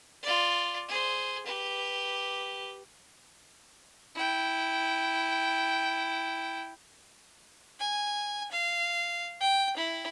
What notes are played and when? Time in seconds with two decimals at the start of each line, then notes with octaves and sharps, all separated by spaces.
0.23 F4 D5
0.88 G#4 C5
1.46 G4 B4
4.15 E4 G5
7.80 G#5
8.51 F5
9.41 G5
9.77 E4